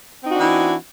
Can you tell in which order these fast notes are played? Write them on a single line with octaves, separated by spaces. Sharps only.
C4 D#4 F#4 D4 E3